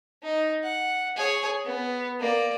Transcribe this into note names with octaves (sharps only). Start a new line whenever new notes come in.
D#4
F#5
G#4 C#5
B3
A#3 D5